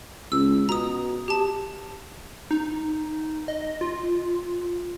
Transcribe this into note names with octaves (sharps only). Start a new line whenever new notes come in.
C#2 E6
B2 A#5 D#6
G4 A5
D#4
D#5
F4